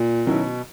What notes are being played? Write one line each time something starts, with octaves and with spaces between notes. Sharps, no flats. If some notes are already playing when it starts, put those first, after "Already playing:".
Already playing: A#2
B2 D#3 F#3 C#4 E4